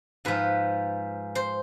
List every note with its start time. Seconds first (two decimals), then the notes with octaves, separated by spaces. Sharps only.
0.25 G#2 F3 B4
1.35 C5